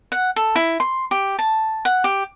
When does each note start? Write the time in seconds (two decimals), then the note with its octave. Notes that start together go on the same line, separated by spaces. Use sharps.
0.12 F#5
0.36 A4
0.56 E4
0.80 C6
1.11 G4
1.39 A5
1.85 F#5
2.04 G4